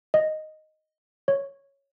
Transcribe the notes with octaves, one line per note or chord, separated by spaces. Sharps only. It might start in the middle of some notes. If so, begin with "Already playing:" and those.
D#5
C#5